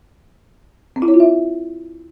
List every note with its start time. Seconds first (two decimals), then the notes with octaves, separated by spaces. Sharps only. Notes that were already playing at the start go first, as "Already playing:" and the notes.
0.96 C4
1.02 E4
1.08 C#5
1.14 F4
1.20 E5